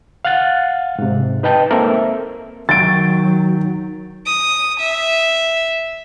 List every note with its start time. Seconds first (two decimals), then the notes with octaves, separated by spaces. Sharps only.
0.25 F5 F#5 F#6 A6
0.99 G#2 C3
1.43 D#4 B4 D#5 G5 A5
1.71 A#3 C4 A4 A#4 E5
2.69 D#3 F#3 G5 C#6 A6 D7
4.27 D#6
4.80 E5